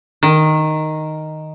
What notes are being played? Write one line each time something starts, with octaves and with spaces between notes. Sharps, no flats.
D#3